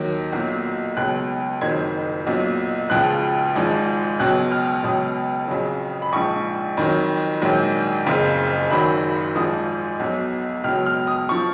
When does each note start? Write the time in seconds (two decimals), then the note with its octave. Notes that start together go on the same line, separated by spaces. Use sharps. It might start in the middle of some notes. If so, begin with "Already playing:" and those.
Already playing: D#2 D#3 F#3
0.33 B1 A#2 F#3
0.97 C#2 B2 F#3 F#6
1.61 F#1 F2 D#3 F#3 G#6
2.26 B1 A#2 F#3
2.90 C#2 C#3 F3 F#6
3.55 G#1 G#2 F3
4.20 C#2 B2 F#3 F#6
4.52 F6
4.67 F6
4.84 C#2 B2 F#3 D#6
5.48 F2 C#3 F#3
6.02 B5
6.12 A#1 G#2 F3 C#6
6.77 F2 D#3 F#3
7.42 A#1 G#2 D#3 F#3
8.07 F#1 F2 C#3
8.71 G#1 F#2 D#3 F#3 B5
9.36 G#1 G#2 F3 D#6
10.00 B1 B2 F#3
10.64 C#2 B2 F#3 F6
10.86 F6
11.07 D#6
11.29 F3 C#6